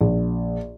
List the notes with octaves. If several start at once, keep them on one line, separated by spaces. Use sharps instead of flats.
A#1